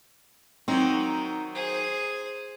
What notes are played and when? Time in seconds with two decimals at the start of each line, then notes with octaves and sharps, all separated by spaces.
0.68 D#3 F#3 C4 D#4
1.55 G#4 C5